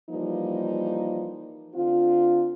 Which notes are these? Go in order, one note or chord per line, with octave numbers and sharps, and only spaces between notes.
E3 F3 G3 A#3 D#4
D3 C4 F4